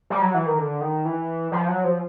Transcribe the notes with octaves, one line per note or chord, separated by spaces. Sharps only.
G3
F#3
E3
D#3
D3
D#3
E3
F3
F#3
F3